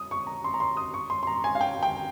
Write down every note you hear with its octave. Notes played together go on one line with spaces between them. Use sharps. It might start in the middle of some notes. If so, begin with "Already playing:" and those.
Already playing: D#6
C#6
A#5
C6
A#5
C6
D#6
C#6
C6
C6
A#5
G#5
F5
G5
G5